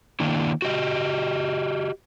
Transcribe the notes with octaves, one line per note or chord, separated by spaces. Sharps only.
D#3 A#3 D4 E4
F#4 G4 D5 D#5